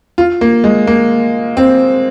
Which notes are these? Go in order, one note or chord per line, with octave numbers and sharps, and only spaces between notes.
F4
A#3
G#3
A#3
C4